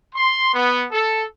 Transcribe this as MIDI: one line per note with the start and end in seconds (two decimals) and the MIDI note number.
0.15 0.52 84
0.54 0.85 59
0.91 1.23 69